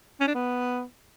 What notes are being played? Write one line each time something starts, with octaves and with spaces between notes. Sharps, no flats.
C#4
D4
B3